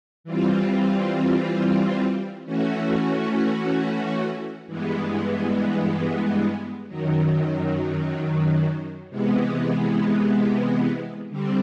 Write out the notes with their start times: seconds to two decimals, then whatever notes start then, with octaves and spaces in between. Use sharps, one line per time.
0.24 E3 G3 C4 F4
2.45 E3 A3 C#4 F#4
4.67 G2 E3 G#3 B3
6.88 F#2 D#3 F#3
9.09 C3 E3 G#3 B3
11.30 D3 G3 C4